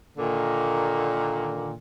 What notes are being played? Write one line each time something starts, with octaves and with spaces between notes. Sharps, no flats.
A#2 D3 D#3 A#3